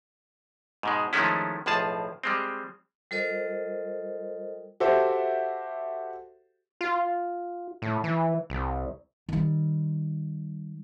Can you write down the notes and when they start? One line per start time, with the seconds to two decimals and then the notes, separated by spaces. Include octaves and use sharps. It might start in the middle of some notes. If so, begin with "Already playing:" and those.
0.83 G#2 B2 G#3
1.13 D#3 F3 G#3 A3 C#4 E4
1.66 B1 A2 F3 G#4 A5
2.24 G3 G#3 C4
3.11 G3 F4 A4 A#4 C5 D#5
4.80 F#4 G4 A4 C5 E5
6.81 F4
7.82 A2
8.04 E3
8.50 C2
9.29 D#3 G3